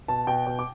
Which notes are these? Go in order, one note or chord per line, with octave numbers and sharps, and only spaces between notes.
B2 A5
B2 G5
B2
D6